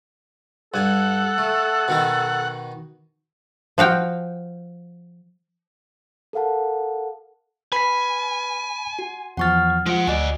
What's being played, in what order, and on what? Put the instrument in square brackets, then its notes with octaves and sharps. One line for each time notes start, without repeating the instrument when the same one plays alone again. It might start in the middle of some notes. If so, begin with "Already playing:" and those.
[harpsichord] G2 G#5 [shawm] A4 [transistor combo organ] F#5
[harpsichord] A3
B2 D#3 D#4
[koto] F3 F#4 F5 G5
[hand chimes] A4 A#4 F5 F#5 A5
[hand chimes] B4 [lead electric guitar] G#5 [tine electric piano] B5 B6
[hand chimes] F#4
[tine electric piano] E2 F3 A6 [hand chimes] F#5 C#6 F6
[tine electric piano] F3 F4 [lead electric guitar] G#3 F#5 [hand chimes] D7
[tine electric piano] D2 [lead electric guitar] F#4 D5 [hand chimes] D#5 G#5